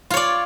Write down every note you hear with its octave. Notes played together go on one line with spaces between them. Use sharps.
F4 C#5 D5